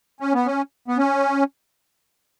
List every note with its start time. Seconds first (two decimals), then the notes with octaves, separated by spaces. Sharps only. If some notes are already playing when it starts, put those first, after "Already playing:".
0.20 C#4
0.34 B3
0.47 C#4
0.88 B3
0.98 C#4